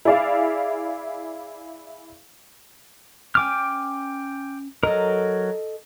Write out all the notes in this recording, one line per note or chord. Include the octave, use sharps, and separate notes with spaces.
E4 G#4 D5 E5 F5
C#4 G5 G#5 D6 F6
F#3 A4 A#4 D#5